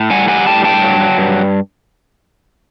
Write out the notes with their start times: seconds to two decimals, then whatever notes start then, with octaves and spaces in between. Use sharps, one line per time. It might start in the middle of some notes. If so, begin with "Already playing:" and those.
Already playing: A2
0.10 G3 F#5 G#5
0.28 G3 F#5 G#5
0.47 A2 G5 A5
0.64 G2 G5 A5
0.82 F#3
1.00 F#3
1.18 G2